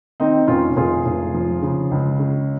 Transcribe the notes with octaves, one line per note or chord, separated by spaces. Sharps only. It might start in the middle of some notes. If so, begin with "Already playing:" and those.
D#3 C4 D#4
F1 C#4 F4
F1 F4 G#4
F1
F3
C#3
C#2
C#3